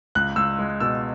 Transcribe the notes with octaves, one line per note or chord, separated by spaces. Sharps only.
C#2 F#6
C#2 E6
G#3
B2 E6